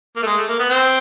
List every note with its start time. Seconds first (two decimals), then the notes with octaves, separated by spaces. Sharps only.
0.16 A#3
0.23 A3
0.26 G#3
0.37 A3
0.48 A#3
0.59 B3
0.70 C4